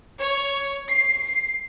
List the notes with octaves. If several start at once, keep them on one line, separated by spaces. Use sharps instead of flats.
C#5
C7